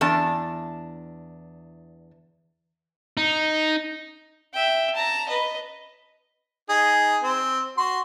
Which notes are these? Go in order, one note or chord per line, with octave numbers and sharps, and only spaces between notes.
E2 D4 A5
D#4
E5 G5
A5 A#5
B4 D#5
D#4 G#4
C4
F#4 C6